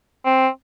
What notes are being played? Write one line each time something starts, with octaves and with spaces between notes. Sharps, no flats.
C4